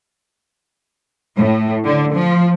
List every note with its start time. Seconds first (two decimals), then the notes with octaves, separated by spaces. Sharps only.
1.38 A2
1.85 D3
2.15 F3